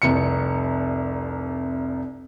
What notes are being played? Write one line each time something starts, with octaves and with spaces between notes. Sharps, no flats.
F1 C2 C#7